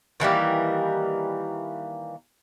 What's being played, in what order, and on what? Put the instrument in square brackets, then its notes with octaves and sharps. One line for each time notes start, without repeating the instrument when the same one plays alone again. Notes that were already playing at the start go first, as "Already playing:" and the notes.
[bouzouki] D#3 E3 G3 A#3